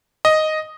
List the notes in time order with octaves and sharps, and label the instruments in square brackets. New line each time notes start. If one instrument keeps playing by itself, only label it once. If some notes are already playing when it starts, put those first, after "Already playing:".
[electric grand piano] D#5